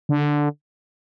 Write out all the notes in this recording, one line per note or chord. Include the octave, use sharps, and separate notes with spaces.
D3